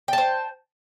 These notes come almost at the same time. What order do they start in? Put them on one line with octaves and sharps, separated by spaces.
G5 A5 C5